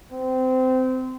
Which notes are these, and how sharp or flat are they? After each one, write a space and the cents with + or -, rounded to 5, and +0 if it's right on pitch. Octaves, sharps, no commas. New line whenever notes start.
C4 -25